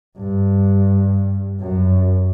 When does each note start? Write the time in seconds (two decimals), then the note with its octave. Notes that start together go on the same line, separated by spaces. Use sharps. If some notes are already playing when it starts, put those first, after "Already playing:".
0.18 G2
1.60 F#2